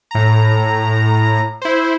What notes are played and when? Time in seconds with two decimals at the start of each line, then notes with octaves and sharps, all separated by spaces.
0.11 A2 A#5
1.62 E4 C5